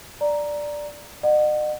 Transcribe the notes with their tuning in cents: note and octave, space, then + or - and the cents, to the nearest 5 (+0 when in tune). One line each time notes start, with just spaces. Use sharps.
D5 +0 A#5 +0
D#5 -45 F#5 +0